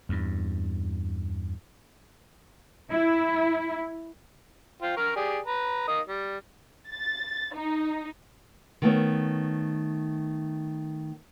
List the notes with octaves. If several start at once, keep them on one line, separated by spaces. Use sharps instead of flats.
E2 G2
E4
F4 C5 G5
A#4 C#6 F6
G4 G#4 D5
B4 A#5
A#3 D#4 D#6
G3
A6
D#4
D#3 A3 B3 C#5